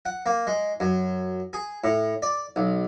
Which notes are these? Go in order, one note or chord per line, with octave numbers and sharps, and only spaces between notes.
F#5
A#3
G#3
F#2
G#4
A2
D5
B1